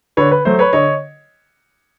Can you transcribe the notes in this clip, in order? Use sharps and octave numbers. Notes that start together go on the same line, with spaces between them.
D3 B4 C#5
B4
F#3 A3 C5
B4 C#5
D3 C#5 D#5